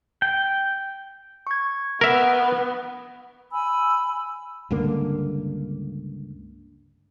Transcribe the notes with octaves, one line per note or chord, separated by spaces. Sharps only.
G5
C#6 G#6
B3 A#4 E5
G#5 B5 E6
C#2 G2 D3 A#3